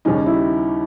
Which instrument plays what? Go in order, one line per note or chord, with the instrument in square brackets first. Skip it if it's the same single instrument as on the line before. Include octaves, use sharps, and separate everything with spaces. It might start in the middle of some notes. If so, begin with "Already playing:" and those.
[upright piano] D#2 C#3 G3 C#4 G#4 [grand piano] D#4
[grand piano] E4